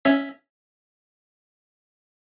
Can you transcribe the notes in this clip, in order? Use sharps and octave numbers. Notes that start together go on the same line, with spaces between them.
C#4 E5 B6